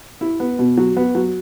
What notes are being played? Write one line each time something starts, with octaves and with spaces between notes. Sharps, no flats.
E4
B3
B2
F#3
B3
F#3